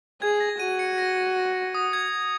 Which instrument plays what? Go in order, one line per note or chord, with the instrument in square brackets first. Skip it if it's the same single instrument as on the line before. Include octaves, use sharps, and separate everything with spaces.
[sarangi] G#4 [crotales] G#6
[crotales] A#6
[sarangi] F#4 [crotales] D#7
[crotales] C#7
A#6
D#6
G#6